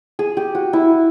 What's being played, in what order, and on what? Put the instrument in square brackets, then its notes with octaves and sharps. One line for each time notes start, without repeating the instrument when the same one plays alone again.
[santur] G#4
G4
F#4
E4